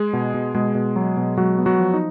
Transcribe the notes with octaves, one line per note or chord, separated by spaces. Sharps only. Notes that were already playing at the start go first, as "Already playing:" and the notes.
Already playing: G#3 G#4
B2
B2
B2 G#3 G#4
B2
F#3
B2
F#3 G#3 F#4
B3
F#3 F#4
F3
D#4